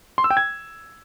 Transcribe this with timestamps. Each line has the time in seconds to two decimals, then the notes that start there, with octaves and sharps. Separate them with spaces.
0.18 C6
0.24 E6
0.30 G5
0.37 G#6